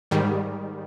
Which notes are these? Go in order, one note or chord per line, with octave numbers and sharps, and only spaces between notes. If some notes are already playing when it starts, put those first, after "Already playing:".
G#2 D#3 G3